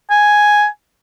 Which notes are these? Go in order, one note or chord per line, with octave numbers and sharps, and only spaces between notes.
G#5